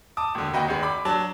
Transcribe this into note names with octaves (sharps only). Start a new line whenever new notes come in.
A5 D6 D#6
E1 D3
D#2 F#4 B4 D#5 G5
G#1 G#3
B5 D6
F#3 D4 A5